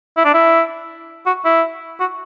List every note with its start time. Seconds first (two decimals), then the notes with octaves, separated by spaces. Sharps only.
0.17 E4
0.25 D4
0.34 E4
1.26 F#4
1.45 E4
2.00 F#4